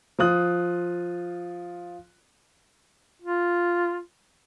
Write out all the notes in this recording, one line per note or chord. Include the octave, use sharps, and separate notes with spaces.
F3 F4 D#6 F#6
F4